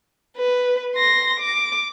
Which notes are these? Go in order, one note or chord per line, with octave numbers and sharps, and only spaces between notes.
B4
C6 A#6
D6